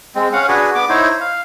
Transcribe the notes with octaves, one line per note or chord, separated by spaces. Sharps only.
G#3 C4
C#4 F5 F#5
D4 F#4 G#4 B4
B3 D6
D#4 E4 C5 C#5
F5